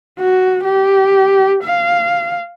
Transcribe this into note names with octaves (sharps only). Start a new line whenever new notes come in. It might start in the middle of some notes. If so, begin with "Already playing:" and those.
F#4
G4
F5